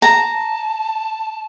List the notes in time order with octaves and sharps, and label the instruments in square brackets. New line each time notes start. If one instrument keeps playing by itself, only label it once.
[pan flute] A5 [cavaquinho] A#5